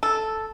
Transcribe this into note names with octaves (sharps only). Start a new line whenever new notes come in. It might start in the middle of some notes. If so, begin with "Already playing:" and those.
A4